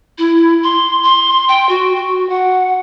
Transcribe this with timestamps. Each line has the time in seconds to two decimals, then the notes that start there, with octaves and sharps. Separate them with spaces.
0.18 E4
0.64 C6
1.03 C6
1.48 G5
1.69 F#4
1.96 F#4
2.30 F#5